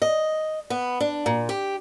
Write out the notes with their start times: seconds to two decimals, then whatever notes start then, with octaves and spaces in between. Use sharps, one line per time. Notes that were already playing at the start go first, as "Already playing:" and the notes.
0.02 D#5
0.70 B3
1.00 D4
1.26 A#2
1.49 G4